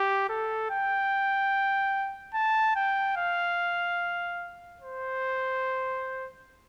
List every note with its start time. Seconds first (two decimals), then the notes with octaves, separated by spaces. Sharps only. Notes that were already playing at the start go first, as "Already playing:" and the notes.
Already playing: G4
0.29 A4
0.70 G5
2.34 A5
2.76 G5
3.17 F5
4.81 C5